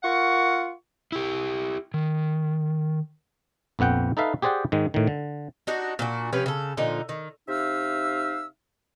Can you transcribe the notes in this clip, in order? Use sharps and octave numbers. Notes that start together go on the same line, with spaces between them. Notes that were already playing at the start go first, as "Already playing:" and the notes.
F4 A#4 F#5 C#6
E4 G4
D#3
A#1 F2 B3 F#5 G5
D#4 A4 B4 E5 F5
G4 G#4 C5 D5 F#5 G5
G#2 D#3 G#3
A2 D#3
D3
D4 D#4 F#4
A#2 D4 F#4
C3 F3 C#4 B4
C#3 A4
A#2 D3 F3 D#4
D#3
C3 D#4 E5 F5 E6